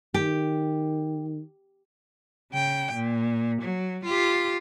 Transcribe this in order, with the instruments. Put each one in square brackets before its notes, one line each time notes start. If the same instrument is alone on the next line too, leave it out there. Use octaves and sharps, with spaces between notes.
[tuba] D#3 [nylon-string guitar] G4
[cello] C#3 G5
A#2
F#3
F4 G4